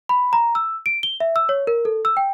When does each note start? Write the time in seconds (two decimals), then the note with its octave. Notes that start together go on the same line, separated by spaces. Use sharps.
0.09 B5
0.33 A#5
0.55 E6
0.86 D7
1.03 G7
1.20 E5
1.36 E6
1.49 C#5
1.67 A#4
1.85 A4
2.05 E6
2.17 G5